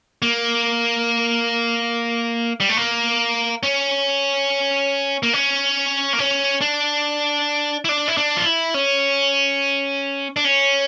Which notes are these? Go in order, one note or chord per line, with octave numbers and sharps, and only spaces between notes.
A#3
G3
A3
A#3
C#4
A#3
C#4
A#3
C#4
D4
E4
D4
E4
D4
F4
E4
C#4
D4
C#4